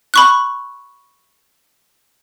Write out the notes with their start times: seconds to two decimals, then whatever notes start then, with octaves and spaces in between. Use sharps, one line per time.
0.14 B5 C#6 F#6